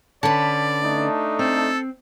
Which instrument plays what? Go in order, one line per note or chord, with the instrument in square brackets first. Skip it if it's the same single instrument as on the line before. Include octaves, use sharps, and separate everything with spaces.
[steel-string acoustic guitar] D3 C#4 B4 [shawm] D5 [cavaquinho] A5 B5
[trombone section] A3 D4 D#4
[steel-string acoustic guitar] C4 [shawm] A4